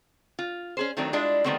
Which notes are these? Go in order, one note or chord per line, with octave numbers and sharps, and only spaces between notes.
F4
C#4 G#4 C5
D#3 F#3 A3 C4 D4
G3 G#3 D4 E4 F4
D#3 F#3 G3 A3 B3 C4